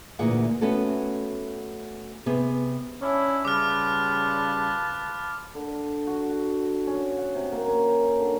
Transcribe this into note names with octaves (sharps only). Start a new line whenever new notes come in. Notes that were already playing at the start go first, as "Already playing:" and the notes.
D2 A#2 E3 G#4 F#5
A3 B3 C#4 F#4 A4
C3 B3 G#4
C#4 D4 E4
C#3 G3 F4 B4 A5 D6 F6
D3
F#4
F#4
C#4
F#5
C3
A#3
C#4
G5
D3